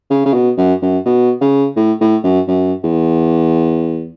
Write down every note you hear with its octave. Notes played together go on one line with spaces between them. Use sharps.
C#3
C#3
B2
F#2
F#2
B2
C#3
A2
A2
F#2
F#2
E2